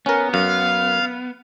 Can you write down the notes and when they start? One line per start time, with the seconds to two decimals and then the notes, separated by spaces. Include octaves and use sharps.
0.06 B3 C#4 A#4
0.34 F#2 F5